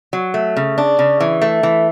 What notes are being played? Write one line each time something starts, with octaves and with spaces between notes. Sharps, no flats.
F#3
A3
C#3
D4
C#3
E3
A3
E3